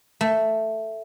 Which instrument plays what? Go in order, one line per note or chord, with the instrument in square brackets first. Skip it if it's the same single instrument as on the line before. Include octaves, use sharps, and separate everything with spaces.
[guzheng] A3